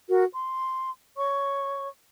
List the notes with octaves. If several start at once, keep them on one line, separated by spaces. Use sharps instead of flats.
F#4 A#4
C6
C#5 C#6